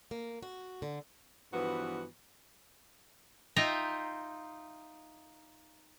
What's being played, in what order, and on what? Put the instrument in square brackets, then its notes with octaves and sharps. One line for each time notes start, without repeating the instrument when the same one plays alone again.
[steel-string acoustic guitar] A#3
F#4
D3
[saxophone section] G2 E3 F3 B3 F#4
[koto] D#4 F4 D#5 E5 G5 A#5